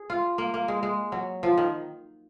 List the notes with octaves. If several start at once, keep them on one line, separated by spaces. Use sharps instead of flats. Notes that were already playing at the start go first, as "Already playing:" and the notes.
Already playing: G#4
F4
A#3
A#3
G#3
G#3
F#3
F3
D#3